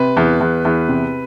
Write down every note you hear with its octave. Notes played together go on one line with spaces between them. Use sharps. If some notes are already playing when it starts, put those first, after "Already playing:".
Already playing: C3 B4
E2
E2
E2
C3